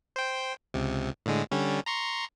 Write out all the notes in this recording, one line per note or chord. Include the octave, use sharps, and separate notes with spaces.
C5 G5
C#2 C3
A2 D3 G#3
D3 G3 C#4
A#5 C6 C#6